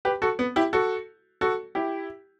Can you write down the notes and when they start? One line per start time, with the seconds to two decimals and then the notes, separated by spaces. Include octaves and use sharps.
0.05 G4 B4
0.22 F#4 A4
0.39 B3
0.56 E4 G4
0.73 F#4 A4
1.41 F#4 A4
1.75 E4 G4